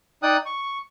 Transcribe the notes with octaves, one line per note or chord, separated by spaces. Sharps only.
D#4 D5 G5 D#6 F#6
C#6